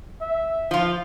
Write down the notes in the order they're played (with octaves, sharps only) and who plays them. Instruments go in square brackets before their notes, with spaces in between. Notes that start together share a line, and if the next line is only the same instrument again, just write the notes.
[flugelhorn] E5
[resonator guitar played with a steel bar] F3 F4